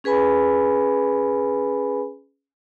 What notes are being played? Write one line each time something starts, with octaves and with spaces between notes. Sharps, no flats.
C#4 G#4 B4 G#5 B5